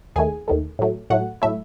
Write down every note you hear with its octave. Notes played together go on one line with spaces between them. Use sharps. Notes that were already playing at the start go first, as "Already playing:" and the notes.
D#2 D#3 A3 G#4 G#5
D#2 D#3 A3
A2 F#3 A3
A2 F#3 A3 F#4 F#5
A2 F#3 A3 E4 E5